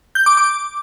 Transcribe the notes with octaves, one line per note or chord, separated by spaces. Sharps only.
G6
D6
D6